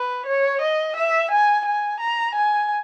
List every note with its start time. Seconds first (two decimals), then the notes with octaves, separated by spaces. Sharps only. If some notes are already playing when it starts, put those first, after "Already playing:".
Already playing: B4
0.27 C#5
0.62 D#5
0.97 E5
1.31 G#5
1.66 G#5
2.01 A#5
2.35 G#5